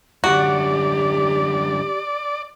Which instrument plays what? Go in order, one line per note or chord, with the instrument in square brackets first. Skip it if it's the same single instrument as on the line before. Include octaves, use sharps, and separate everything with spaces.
[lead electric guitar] F#2 D3 [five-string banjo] F#4 [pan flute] G4 [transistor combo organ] D5